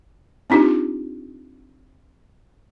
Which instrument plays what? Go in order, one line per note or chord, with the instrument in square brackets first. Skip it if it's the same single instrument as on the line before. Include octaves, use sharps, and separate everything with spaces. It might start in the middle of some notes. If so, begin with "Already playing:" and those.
[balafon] C4 D4 D#4 F4 G4